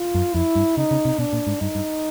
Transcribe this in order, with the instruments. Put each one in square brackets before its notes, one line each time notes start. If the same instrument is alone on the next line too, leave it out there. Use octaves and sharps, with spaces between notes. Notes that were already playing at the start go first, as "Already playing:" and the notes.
Already playing: [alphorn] F4
[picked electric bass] F#2
[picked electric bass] F2 [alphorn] E4
[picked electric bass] G2
[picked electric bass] C#3 [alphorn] D#4
[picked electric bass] C#3
C3
[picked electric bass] B2 [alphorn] D4
[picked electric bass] A#2
G#2
[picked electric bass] G2 [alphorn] D#4
[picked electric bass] G2